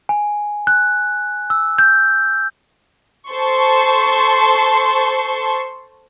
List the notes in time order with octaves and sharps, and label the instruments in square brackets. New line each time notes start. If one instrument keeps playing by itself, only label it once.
[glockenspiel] G#5
F#6
E6
G6
[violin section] A4 C5 A5 C6 C#6